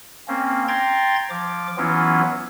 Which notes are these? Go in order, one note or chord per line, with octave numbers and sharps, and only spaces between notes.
A#3 C4 C#4
G5 A#5 C6 G#6 A6
F3 D6
E3 F#3 B3 C#4 E4 F4